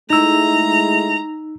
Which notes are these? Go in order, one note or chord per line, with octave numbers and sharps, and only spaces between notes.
G#3 A3 D#4 E4 A#5 E6